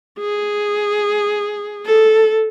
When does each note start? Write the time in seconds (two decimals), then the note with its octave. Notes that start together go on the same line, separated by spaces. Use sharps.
0.20 G#4
1.85 A4